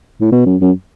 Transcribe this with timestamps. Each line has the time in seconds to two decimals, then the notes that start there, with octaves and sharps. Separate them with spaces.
0.21 A2
0.32 B2
0.46 F#2
0.61 F#2